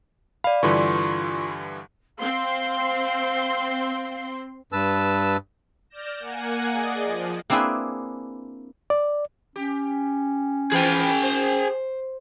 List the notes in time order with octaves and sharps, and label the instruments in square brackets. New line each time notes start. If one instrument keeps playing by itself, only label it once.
[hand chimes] D5 B5 [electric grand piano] F5
[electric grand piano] G2 D3 E3 [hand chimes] F4 C6 C#6
[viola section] C4 C6 [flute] F5
[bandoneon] G2 B4 A5 E6
[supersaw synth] D5 F6 G6 A#6 E7
A#3 F#5 G#5
G#4 D5 D#5
F3
[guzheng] A#3 C4 D4 E4 G#4 B4
[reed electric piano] D5
[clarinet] C#4 [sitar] G4
[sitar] E3 F4 B4 [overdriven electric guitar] G#4 G5
[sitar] C5